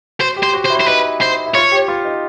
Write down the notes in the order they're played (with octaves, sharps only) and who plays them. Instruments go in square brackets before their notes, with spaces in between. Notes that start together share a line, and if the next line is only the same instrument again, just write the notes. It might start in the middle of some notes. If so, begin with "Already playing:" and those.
[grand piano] F#4 [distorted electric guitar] C5
[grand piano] G4
[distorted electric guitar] C5
[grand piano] F#4
[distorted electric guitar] C5
[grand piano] E4
[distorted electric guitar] C5
[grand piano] D#4 [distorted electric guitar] B4
[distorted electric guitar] C5
[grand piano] E4
[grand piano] F4 [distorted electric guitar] C#5
[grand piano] G4
F4
D#4